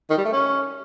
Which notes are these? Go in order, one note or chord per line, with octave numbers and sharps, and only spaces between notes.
D#3
G3
A3
C#4